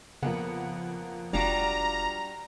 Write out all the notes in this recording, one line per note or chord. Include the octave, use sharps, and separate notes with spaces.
F2 C#3 A#3 B3 F#5
F1 G3 D4 F4 F#4 A#5